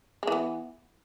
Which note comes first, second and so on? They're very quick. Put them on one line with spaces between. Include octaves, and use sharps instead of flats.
G#3 E3 B3